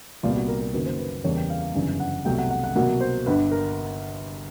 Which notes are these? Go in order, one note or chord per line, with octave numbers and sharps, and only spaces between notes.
C2 A#2 G3 B3 F4
F#4
A#4
A#4
F#1 F#2 D#3 F#3 A#3 B4
C5
B4
E2 C#3 E3 G3 A#3 C#5
G5
F5
F5
G1 F#2 C#3 E3 G3
F#5
C2 B2 F#3 A3 G5
F#5
F#5
F#5
C2 B2 F#3 A#3 F#5
C5
G1 G2 D3 B4
A#4